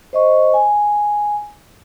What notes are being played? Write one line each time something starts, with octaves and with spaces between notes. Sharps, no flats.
C5 D#5 C#6
G#5